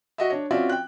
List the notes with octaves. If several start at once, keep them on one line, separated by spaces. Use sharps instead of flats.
F#4 D#5 E5
D4 C#5
C4 C#4 F4 F#4 D5 E5
G5 F#6